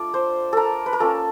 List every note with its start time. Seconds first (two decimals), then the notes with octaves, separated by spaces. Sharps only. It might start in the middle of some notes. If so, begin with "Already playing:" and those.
Already playing: A3 D4 F4 D5
0.14 C5
0.53 A4 A#4
0.86 B4
0.93 A#4
1.00 A#3 C#4 F4 A4